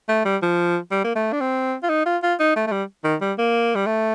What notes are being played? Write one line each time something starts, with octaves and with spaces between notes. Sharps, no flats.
A3
G3
F3
G3
A#3
A3
D4
C4
F4
D#4
F4
F4
D#4
A3
A3
G3
D#3
G3
A#3
G3
A3